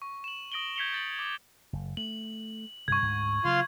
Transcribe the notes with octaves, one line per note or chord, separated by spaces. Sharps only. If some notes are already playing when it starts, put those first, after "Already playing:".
C#6
E7 F#7
D#6 A#6 D7 F#7 G7
G6 G#6 B6 C#7 F7 G7
G6 A6 F#7
D6
F#1
A3 F#7
G2 C3 C#6 G#6
D2 G#2
C#3 F#3 F4 F5 C6